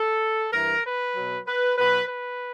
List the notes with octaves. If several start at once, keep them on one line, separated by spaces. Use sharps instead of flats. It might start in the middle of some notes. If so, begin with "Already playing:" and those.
Already playing: A4
G2 E3 A#4
B4
B2 F#3
B4
B2 F#3 B4
B4